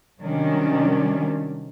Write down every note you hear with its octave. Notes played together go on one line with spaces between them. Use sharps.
C3 D#3 F#3 G3 C#4 D4